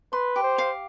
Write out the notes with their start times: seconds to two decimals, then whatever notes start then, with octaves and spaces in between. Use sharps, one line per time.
0.13 B4 C6
0.36 G4
0.43 C5
0.58 F5